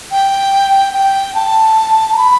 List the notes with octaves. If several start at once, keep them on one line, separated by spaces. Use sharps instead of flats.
G5
G5
A5
A#5
B5